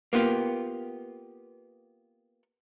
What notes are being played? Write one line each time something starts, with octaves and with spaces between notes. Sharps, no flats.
A#3 B3 F4 G4